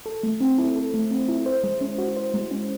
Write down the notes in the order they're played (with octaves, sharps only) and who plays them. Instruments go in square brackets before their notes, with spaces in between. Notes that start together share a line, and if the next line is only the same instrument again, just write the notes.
[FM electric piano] A4
A3
C4
E4
A4
A3
C4
E4
C5
G#3
C#4
F#4
C5
G#3
C#4